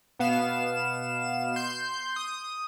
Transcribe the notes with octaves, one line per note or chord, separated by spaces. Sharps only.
B2 B3 F5 E7
C6 G6
D#6